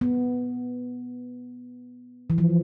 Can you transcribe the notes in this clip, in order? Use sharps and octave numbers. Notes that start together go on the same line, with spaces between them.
B3
E3
F3